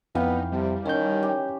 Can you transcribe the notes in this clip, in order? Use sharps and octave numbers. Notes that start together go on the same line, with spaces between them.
F2 E3 B3 D#4 F5 G5
C3 G3
D#3 C#4 C#5 G6
G4